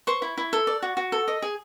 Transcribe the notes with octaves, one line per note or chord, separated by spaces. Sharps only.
C5 C#6
E4
E4
A4
D5
F#4
F#4
A4
D#5
G#4